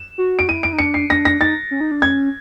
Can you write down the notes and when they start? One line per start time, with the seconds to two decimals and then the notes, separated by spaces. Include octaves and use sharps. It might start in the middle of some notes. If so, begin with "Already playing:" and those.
Already playing: E7
0.18 F#4
0.39 D7
0.48 E4 D#7
0.63 D7
0.73 D#4
0.79 D4 C#7
0.94 C7
1.09 D4 A#6
1.25 A#6
1.40 D#4 A6
1.71 C#4
1.81 D#4
1.91 D4
2.01 C#4 G#6